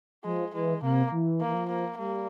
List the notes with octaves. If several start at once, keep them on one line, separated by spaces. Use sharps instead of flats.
F3 G#3
E3 G#3
C3 A#3
E3
A#3
E3
F3
A#3
G3 A#3